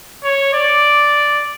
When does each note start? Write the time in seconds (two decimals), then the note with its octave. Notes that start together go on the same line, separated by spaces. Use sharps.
0.24 C#5
0.54 D5